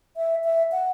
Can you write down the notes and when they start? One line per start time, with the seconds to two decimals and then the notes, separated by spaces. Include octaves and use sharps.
0.17 E5
0.44 E5
0.72 F#5